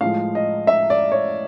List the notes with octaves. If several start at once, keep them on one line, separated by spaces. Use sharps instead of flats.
A2 F3 G#3 F5
D#5
E5
D5
C#5